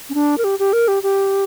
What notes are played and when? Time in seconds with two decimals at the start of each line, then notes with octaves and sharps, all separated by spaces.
0.10 C#4
0.14 D4
0.38 A#4
0.44 G4
0.59 G4
0.73 A#4
0.88 G4
1.03 G4